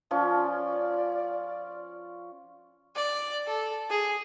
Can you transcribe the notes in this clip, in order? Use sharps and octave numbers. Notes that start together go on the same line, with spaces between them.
F3 C#4 F4 D5
D5
A4
G#4